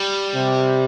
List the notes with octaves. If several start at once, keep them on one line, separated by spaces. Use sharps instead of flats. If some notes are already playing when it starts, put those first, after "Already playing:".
Already playing: G3
C3